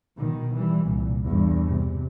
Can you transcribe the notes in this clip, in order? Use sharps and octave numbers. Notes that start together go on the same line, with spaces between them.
B2 D#3
E3 G3
C2 A#2
E2 G2
C3